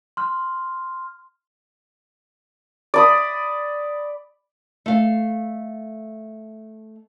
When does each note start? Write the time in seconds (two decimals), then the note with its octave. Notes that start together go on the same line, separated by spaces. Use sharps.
0.17 C6 F6
2.94 D5 B5 D#6
4.86 A3 F5